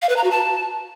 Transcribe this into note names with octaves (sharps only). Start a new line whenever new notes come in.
F5
B4
A#5
F#4
A5